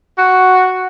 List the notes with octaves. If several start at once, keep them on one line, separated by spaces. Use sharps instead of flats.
F#4